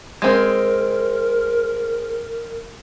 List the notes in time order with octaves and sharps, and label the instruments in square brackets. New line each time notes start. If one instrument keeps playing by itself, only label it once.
[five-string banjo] G#3 C4 [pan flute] A#4